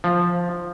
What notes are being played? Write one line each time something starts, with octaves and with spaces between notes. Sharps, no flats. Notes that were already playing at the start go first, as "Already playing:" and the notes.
F3